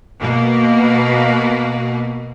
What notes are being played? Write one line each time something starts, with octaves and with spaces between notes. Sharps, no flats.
B2 A#3